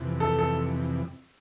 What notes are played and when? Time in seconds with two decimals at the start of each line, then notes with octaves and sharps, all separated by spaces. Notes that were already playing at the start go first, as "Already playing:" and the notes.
Already playing: F2 C3 E3
0.20 A4
0.39 A4